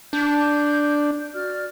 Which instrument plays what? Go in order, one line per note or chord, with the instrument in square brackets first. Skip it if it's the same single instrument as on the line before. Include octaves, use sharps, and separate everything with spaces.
[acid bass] D4 [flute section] G6
[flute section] F#4 D5 F6